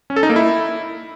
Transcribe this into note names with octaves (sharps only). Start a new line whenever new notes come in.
C#4
A4
D#4
A#3
E4